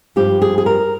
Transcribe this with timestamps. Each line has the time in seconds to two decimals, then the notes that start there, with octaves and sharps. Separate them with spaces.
0.16 G2 F3 G4
0.42 G#4
0.58 G#4
0.66 A#4